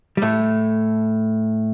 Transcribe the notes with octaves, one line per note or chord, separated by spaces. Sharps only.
G3
A2 A3